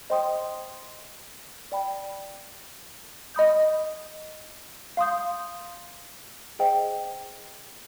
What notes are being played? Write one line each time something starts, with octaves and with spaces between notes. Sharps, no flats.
C5 D#5 G5 C6 D#6
D5 G5 B5
D#5 B5 D#6 G6
F5 C6 D#6 G6
G#4 C5 D#5 G5